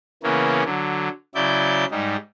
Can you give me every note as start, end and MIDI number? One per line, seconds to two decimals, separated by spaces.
0.23 0.63 49
0.23 0.63 52
0.23 0.63 58
0.23 0.63 59
0.23 0.63 61
0.65 1.09 50
0.65 1.09 54
1.35 1.85 49
1.35 1.85 54
1.35 1.85 64
1.35 1.85 74
1.35 1.85 91
1.91 2.16 44
1.91 2.16 55
1.91 2.16 63